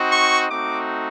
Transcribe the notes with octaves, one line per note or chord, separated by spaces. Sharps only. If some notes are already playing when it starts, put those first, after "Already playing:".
Already playing: C4 D#4 F#4
C#6
A3 C4 D#4 F#4 D6